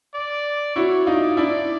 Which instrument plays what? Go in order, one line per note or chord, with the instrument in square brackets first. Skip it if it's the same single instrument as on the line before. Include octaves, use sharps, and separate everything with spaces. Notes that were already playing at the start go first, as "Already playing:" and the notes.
[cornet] D5
[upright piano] E4 F#4 [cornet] C#5
[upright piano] D#4 F4 [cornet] D5
[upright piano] D4 E4 [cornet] D5